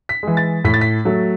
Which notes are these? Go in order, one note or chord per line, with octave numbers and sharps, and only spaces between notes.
B6
E3 G#3
A6
A2 B6
A6
B6
F#3 A3